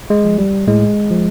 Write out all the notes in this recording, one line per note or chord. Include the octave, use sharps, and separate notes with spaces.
G#3
F3
G3
A2 G#3
F3